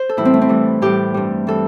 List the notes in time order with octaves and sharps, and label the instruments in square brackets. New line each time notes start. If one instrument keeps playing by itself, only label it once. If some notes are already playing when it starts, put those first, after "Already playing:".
Already playing: [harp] C5
A4
A2 E3 G3 E4
C4
A3
C4
A2 E3 G3
A2 E3 G3 G4
G2 G3
E3 G3 A4